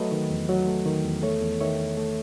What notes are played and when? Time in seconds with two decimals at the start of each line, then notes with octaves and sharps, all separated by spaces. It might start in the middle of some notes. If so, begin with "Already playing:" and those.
Already playing: F#3 A3 B4 D#5
0.12 D#3
0.30 E2
0.49 F#3
0.67 A3
0.86 D#3
1.04 E2
1.22 A3 A4 C#5
1.41 E2
1.60 D#3 C#5 E5
1.78 E2
1.98 A3